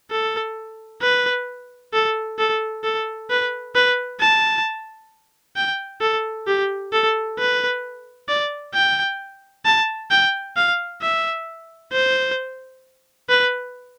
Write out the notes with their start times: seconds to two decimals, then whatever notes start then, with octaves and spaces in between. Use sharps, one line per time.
0.11 A4
1.01 B4
1.93 A4
2.38 A4
2.84 A4
3.30 B4
3.75 B4
4.20 A5
5.57 G5
6.01 A4
6.47 G4
6.92 A4
7.39 B4
8.29 D5
8.74 G5
9.66 A5
10.11 G5
10.56 F5
11.02 E5
11.92 C5
13.29 B4